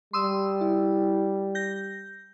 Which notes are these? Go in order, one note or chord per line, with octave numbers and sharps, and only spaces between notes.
G3 C6 D#6 E6
E4
G6 A#6